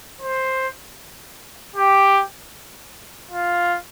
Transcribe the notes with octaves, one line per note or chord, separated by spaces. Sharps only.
C5
G4
F4